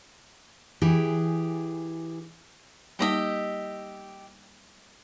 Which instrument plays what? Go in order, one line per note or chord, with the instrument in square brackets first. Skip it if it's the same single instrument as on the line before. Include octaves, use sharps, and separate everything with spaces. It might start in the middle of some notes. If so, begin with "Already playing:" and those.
[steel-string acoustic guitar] E3 G4 G#4
[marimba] G3 A#3 D#4 [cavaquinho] G4 D#5 E5